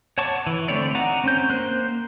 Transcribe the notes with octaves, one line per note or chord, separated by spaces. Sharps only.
C#5 F#5 A5 C#6 D6
E3
D3 A3 C4 C#5 D5
D#4 F#4 F#5 A#5 D6
C4 C#4 G6
A#3 C5 F#6